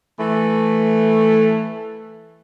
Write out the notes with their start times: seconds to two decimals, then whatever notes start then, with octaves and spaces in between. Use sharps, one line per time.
0.20 E3 A3